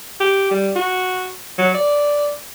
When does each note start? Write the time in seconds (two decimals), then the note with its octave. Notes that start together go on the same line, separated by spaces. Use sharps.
0.20 G4
0.51 G3
0.76 F#4
1.58 F#3
1.74 D5